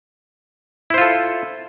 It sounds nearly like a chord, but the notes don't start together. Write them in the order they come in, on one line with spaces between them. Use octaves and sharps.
E4 C5 F4 A4